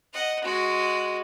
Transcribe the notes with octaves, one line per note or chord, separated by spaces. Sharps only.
D#5 F#5
G#3 F#4